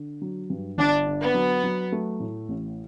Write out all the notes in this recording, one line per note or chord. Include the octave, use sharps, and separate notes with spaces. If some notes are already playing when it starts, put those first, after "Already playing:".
Already playing: D3
F#3
G2
G1 D4
D3
B3
F#3
F#3
A3
A2
A1